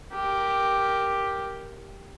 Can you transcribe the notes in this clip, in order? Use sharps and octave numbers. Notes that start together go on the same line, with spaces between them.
G4 A#4